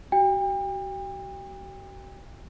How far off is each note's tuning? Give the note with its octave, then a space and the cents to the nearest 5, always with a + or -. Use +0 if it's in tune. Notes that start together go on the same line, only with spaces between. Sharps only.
F#4 +40 G5 +35